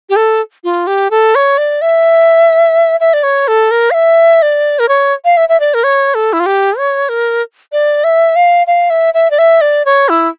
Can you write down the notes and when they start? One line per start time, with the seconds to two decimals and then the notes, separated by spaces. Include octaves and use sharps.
0.09 G4
0.16 A4
0.64 F4
0.87 G4
1.11 A4
1.35 C#5
1.58 D5
1.81 E5
3.00 E5
3.13 D5
3.23 C#5
3.48 A4
3.71 A#4
3.91 F5
3.94 E5
4.42 D5
4.79 A#4
4.88 C#5
5.25 F5
5.37 E5
5.49 E5
5.60 D5
5.74 A#4
5.84 C#5
6.14 A4
6.33 E4
6.40 F4
6.46 G4
6.78 C#5
7.09 A#4
7.72 D5
8.04 E5
8.36 F5
8.67 F5
8.90 E5
9.14 E5
9.31 D5
9.38 E5
9.61 D5
9.85 C#5
10.09 E4